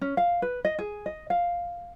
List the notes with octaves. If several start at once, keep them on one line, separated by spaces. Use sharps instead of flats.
C#4
F5
B4
D#5
G#4
D#5
F5